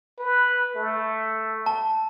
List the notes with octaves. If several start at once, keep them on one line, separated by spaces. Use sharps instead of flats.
B4
A3
A5